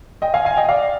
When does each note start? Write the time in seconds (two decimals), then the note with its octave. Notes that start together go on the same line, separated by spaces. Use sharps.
0.22 D#5 G5
0.34 F5 G#5
0.45 F5 G#5
0.57 D#5 G5
0.69 D5 F5